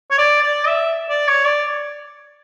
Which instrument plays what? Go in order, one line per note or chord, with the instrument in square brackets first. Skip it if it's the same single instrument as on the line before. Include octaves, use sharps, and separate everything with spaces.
[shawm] C#5
D5
D5
E5
D5
C#5
D5